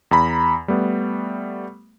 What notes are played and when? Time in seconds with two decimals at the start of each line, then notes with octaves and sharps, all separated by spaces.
0.11 E2 A#5 B5
0.68 G3 A3 B3